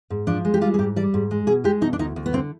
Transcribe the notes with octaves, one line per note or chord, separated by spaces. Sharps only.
G#2
F3 D4
G#3
G4
G3 F4
G#4
G#2 G4
G3 D5
G#2
G#3
B2 G#4
G#3 G4
B2 D#4
D4
D2 D#4
D2
B3
D3 C4